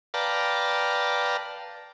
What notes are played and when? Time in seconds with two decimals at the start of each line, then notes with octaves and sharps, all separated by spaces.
0.14 B4 D5 F5 G5 A5 A#5